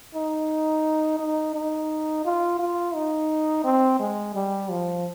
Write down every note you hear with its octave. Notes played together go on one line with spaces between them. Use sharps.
D#4
D#4
D#4
F4
F4
D#4
C4
G#3
G3
F3